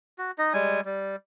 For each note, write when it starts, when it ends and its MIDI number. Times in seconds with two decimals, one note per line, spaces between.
0.18 0.31 66
0.38 0.53 63
0.38 0.53 75
0.53 0.81 55
0.53 0.81 56
0.53 0.81 80
0.85 1.16 55